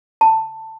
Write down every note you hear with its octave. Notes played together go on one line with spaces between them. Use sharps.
A5